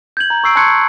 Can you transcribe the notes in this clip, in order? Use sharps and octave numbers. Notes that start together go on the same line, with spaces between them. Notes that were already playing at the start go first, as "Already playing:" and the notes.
G6 G#6 F#7
A#5
C#6 E6 C7 D7
A5 C6 C#6 F#6 G#6 C#7
C#7